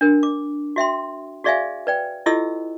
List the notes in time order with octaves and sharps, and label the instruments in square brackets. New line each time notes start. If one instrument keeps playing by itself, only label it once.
[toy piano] D4 A#4
D6
F#4 E5 G5 C6
F#4 G#4 D5 E5 F5 G#5
B4 D5 G5
E4 F4 G4 A4 D#5 E6